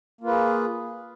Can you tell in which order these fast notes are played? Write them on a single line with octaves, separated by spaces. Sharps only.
A#3 F4 B4 G#4